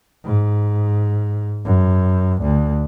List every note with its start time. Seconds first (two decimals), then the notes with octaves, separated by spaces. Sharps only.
0.25 G#2
1.65 F#2
2.42 D2